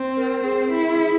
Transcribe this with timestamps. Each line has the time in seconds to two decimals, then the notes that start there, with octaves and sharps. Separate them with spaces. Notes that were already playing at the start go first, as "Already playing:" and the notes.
Already playing: C4
0.17 A#4
0.44 C4 G#4
0.72 E4